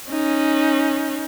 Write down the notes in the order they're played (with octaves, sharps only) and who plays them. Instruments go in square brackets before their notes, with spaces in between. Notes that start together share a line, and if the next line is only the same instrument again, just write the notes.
[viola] C#4 D#4